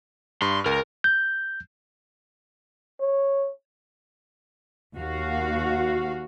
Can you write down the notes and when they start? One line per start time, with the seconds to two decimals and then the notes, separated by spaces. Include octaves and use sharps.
0.42 G2 C6
0.66 C#2 A#4
1.04 G6
3.00 C#5
4.96 D#2 F#4 F5